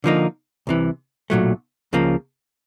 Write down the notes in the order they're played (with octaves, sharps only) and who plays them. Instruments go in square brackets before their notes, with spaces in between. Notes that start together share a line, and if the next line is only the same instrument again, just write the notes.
[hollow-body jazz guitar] D3 F3 A#3 D#4
C2 C3 E3
B1 A#2 F#3 A3
C#2 C#3 F3 A#3